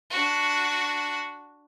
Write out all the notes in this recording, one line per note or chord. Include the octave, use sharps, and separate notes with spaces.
D4 F#4